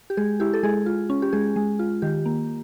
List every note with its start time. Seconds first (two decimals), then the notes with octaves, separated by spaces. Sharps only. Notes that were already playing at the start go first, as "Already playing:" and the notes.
0.10 G4
0.17 G#3 G#4
0.40 E4 G4
0.53 A4
0.63 G#3 G#4
0.86 F4
1.10 C#4
1.22 G4
1.33 G#3 G#4
1.56 G#3
1.79 F4
2.02 D#3 G4
2.26 A#3